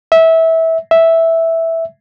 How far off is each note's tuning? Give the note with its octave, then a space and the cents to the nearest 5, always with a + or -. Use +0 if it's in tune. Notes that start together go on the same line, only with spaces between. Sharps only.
E5 -20
E5 -5